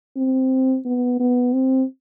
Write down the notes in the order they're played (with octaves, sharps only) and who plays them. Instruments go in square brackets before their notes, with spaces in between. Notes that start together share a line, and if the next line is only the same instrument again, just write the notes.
[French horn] C4
B3
B3
C4